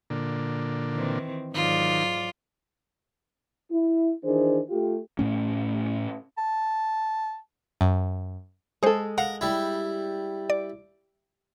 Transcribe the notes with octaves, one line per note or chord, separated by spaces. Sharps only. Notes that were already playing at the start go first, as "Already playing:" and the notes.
A#2 D3
D#3 E3 C4
G#2 D#3 F#3 F4 D5
E4
D#3 E3 D4 G#4 C5
A3 F4 G4
A2 A3 C#4
A5
F#2
G#3 G#4 A4 C5
A#4 F5 F#5
G3 E4
D5